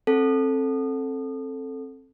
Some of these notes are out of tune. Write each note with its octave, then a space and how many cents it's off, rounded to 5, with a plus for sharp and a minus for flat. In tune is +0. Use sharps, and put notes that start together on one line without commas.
C4 +25 A4 +0